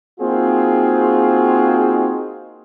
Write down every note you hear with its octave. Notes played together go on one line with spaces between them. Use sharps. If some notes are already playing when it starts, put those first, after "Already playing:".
A#3 C4 D#4 F4 F#4 G#4